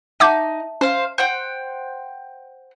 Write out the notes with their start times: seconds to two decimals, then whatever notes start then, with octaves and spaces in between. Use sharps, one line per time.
0.20 D#4 E5 F#5 A5 D6 G6
0.81 C#4 C5 F5
1.18 C5 F#5 G5